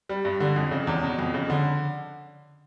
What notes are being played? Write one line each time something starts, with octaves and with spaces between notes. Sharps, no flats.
G3
G2
D3
F2
C#3
E2
B2
F2
C#3
D3